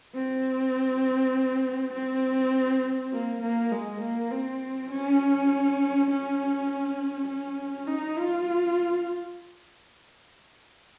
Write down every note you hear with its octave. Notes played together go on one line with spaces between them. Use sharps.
C4
C4
A#3
A#3
G#3
A#3
C4
C#4
C#4
C#4
D#4
F4